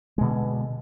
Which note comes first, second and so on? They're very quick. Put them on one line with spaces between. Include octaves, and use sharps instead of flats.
G#3 B2 D3